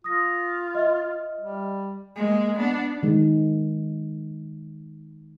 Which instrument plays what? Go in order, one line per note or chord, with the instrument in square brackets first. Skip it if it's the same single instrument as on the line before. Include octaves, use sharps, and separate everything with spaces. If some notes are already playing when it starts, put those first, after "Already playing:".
[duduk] F4 [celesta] D#6 A#6
[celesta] D#5 E5 F6
[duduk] G3
[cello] G#3 A#3
B3 D4
[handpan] D#3 G#3